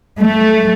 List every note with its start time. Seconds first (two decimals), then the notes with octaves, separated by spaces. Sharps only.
0.20 A3